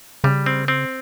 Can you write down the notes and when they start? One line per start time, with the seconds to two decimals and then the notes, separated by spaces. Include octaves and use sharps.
0.24 C#3 G3
0.46 C4
0.68 C4